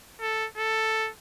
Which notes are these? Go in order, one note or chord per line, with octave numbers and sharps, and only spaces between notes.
A4
A4